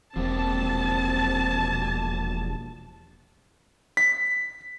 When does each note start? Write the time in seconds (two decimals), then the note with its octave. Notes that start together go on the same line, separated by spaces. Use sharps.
0.16 E1 F3 G3 A#3 C4 A5
3.97 B6